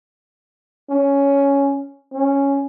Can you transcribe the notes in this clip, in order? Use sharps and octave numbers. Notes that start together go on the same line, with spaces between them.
C#4
C#4